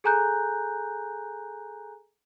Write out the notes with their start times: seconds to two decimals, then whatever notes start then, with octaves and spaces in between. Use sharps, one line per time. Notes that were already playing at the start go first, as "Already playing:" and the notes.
0.04 G#4 A4 G#5 A#5 F#6 G6